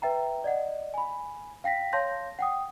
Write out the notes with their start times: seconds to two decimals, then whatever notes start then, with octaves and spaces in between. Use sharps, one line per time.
0.02 B4 E5 G5 A#5
0.44 D5 D#5 F#5
0.94 G#5 B5
1.64 F5 G5 A#6 B6
1.93 C#5 F5 A5 C6 G6 A#6
2.39 F#5 G5 D#6